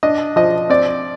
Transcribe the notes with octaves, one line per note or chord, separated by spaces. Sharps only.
D4 D#5
F3 D#5
C4 D5